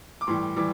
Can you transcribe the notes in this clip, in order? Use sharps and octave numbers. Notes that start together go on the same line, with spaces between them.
D6
A2 E3 G3 C6
E3 G3 D6